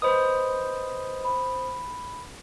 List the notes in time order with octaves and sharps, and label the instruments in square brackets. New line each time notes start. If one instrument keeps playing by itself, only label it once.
[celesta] B4 D#5 B5 [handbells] C5 D#6
[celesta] B5